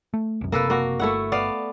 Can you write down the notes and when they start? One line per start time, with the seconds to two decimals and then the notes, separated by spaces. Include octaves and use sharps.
0.14 A3
0.41 C2 F#2
0.52 F#1 C3 A#3 A4 B4
0.70 A#3 F#4
1.00 G1 A3 E4 F#5
1.32 B3 D5 F5